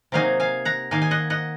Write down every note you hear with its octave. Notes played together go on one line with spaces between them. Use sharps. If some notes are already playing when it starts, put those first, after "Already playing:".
C3 F#3 A#3 D#4 F5 G#5
F5 G#5
F#5 A#5
D#3 A#3 D#4 F5 G#5
G#5
D#5 F#5
D#5 F#5